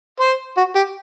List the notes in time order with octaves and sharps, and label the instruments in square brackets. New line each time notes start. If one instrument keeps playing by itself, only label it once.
[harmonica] C5
F#4
G4